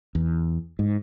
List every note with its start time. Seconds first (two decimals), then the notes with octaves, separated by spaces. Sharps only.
0.15 E2
0.79 G#2